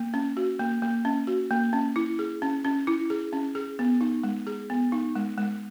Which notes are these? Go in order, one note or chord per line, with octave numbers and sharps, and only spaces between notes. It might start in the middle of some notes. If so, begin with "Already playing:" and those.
Already playing: A#3
C#4
F#4
A#3
A#3
C#4
F#4
A#3
C#4
E4
G#4
C#4
C#4
E4
G#4
C#4
G#4
B3
D#4
G#3
G#4
B3
D#4
G#3
G#3